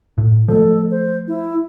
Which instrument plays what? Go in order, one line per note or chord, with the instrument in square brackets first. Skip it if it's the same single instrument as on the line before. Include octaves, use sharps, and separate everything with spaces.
[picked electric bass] A2
[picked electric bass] F3 G#3 A3 [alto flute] A4
[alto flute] C5
E4